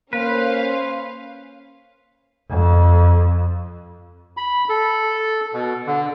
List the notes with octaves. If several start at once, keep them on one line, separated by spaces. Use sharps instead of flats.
A#3 C#4 B4 C5 F5
F2
B5
A4
B2
D3